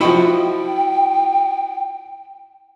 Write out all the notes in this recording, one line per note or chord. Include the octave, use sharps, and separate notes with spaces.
F3 E4 F#4 D#5 G5 B5